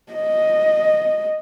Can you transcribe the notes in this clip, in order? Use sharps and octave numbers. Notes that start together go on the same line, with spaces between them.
D#5